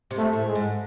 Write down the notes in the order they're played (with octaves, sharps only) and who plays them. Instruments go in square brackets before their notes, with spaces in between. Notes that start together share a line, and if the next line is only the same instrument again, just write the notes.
[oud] C3
[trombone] A3
[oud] A2
[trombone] G#3
[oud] G#2